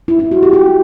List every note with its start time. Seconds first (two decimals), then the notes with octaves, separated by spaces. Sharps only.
0.08 E4
0.19 E4
0.32 F#4
0.43 G4
0.53 G4